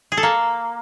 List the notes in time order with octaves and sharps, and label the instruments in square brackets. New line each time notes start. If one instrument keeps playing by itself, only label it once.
[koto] G#4
A4
A#3